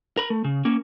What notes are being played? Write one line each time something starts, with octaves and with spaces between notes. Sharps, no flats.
A#4 B5
A3
C#3
A#3 C#4